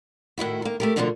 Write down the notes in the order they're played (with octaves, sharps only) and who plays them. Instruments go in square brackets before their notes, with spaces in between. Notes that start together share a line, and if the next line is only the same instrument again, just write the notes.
[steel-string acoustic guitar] A2 D#3 E4 F#4
D#3 A#3
A3 G4 A#4
B2 D3 F3 A3 A#3 D4